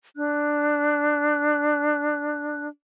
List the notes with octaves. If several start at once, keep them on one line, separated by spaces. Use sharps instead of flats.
D4 F#6